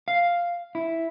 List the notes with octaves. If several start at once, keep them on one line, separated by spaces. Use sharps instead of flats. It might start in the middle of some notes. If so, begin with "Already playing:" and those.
F5
E4